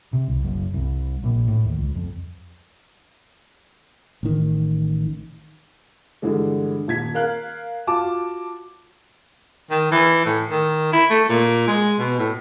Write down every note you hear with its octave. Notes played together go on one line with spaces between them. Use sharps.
C3
C2
F#1
C2
A#1
A2
D#2
C#2
F2
A1 D#3
G2 D3 E3 G#3
D#1 G#6 B6
A#4 F5 F#6
F4 F#4 A5 D6
D#3
E3
A2
D#3
E4
A3
A#2
G#3
B2
A2